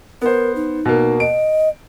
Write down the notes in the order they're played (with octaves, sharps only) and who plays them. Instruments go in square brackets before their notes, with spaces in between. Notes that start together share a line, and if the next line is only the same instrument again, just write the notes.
[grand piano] B3 C5 [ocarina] A#4
[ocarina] D#4
[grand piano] B2 A#3
[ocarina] D#5 [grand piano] D7